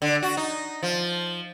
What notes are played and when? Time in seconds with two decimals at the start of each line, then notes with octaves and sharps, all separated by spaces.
0.02 D3
0.23 F#4
0.37 D#4
0.83 F3